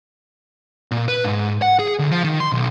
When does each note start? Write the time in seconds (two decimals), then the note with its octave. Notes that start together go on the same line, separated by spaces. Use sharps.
0.91 A#2
1.08 B4
1.24 G#2
1.62 F#5
1.79 G#4
1.99 D2
2.11 F3
2.24 D#3
2.40 C6
2.52 B1